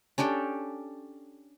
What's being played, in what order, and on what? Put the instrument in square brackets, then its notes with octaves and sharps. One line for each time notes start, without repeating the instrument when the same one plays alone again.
[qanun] C#4 D4 G4 A4